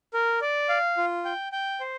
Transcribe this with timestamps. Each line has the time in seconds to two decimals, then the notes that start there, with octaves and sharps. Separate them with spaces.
0.14 A#4
0.42 D5
0.69 F5
0.97 F4
1.25 G5
1.52 G5
1.80 C5